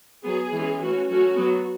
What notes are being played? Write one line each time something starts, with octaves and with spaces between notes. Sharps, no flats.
F#3 B3 G#4
E3 G#3 C#4
E3 A3 C#4 F#4
F#3 A3 C#4 F#4
F#3 B3